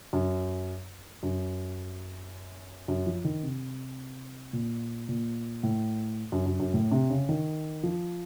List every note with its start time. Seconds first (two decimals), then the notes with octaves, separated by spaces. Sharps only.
0.13 F#2
1.23 F#2
2.88 F#2
3.06 F3
3.24 D#3
3.43 C3
4.53 A#2
5.09 A#2
5.63 A2
6.32 F#2
6.46 F#2
6.60 F#2
6.74 A2
6.91 C3
7.10 C#3
7.29 D#3
7.83 F3